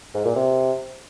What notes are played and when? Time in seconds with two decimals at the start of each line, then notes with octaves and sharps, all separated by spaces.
0.14 G#2
0.25 A#2
0.35 C3